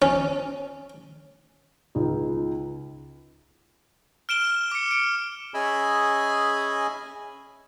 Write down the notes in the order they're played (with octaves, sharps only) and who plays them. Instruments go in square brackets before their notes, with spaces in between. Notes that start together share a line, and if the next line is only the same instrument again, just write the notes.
[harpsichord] C#4
[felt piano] C#2 D#4
[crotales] F6 D7 E7 G7
D6 C#7
D7
[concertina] C#4 G#4 D#5 E5 G#5 B5